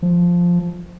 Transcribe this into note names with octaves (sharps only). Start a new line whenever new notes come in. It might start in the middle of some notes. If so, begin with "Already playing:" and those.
F3